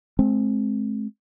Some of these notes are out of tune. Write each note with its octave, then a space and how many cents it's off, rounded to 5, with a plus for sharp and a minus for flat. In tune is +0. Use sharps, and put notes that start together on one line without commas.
G#3 +45 C4 +15